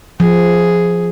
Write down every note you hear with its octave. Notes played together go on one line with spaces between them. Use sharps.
F3 G#4